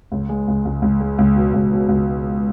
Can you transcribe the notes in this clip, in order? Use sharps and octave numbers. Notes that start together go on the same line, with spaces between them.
C#2
G#3
C#2
C#2
C#2
G#3
C#2
B2
C#2
B2
C#2